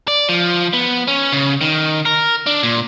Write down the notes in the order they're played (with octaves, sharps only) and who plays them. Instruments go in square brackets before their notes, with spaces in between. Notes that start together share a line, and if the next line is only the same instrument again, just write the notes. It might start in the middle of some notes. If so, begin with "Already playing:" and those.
[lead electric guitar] D5
F3
B3
C#4
C#3
D#3
A#4
D4
A#2